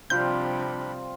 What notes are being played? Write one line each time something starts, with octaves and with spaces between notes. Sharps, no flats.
C3 F3 G3 C4 D4 F4 B5 G6